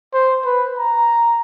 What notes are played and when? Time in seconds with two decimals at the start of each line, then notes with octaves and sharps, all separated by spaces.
0.14 C5
0.45 B4
0.79 A#5